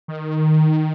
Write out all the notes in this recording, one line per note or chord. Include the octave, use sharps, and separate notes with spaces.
D#3